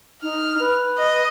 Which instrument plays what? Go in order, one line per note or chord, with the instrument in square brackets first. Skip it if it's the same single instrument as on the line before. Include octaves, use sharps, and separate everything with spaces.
[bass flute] D#4 [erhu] F6
[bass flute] B4
[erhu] D#5